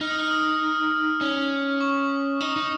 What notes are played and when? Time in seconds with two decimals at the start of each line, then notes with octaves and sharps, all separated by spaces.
0.01 D#4 F6
0.11 D#6
0.19 F6
0.31 D#6
1.21 C#4
1.81 C#6
2.41 D#4 D#6
2.56 D#4